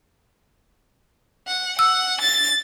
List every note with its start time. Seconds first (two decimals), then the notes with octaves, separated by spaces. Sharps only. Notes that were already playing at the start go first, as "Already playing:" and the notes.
1.47 F#5
1.79 F#5 E6
2.21 A6